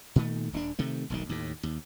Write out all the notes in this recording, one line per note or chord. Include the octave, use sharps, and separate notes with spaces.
A#2 D#3 A3
D#1 C4 D4
C3 D#3 A3
E1 B1 D#3
D#2 A2
D#2